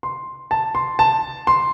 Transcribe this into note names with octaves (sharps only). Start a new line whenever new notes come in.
C6
A5
C6
A5
C6